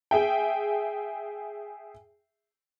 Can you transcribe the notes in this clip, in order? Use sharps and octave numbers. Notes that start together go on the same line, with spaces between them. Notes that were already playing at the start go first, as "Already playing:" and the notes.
G#4 E5 G5